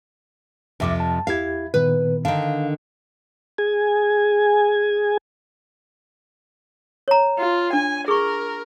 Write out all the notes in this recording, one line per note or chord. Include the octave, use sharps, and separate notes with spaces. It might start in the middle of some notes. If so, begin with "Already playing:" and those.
C2 F2 C3 F3 E5 D6
A5
E2 E4 G4 F5 G#6
A#2 D#3 B3 B4
D3 D#3 F5
G#4 G#5
C#5 A#5
F4
D4 G#5
G#4 A#4 C#6